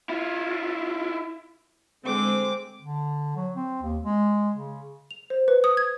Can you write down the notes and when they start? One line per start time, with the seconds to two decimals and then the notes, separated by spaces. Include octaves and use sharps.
0.09 E4 F4
2.04 D3 G#3 C4 D6
2.82 D3
3.36 F#3
3.56 C4
3.82 D#2
4.04 G#3
4.56 C#3
5.11 F7
5.30 C5
5.48 B4
5.64 D#6
5.77 G#6